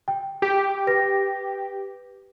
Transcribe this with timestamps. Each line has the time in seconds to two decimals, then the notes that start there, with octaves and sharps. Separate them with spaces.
0.08 G5
0.42 G4
0.87 B4 A#6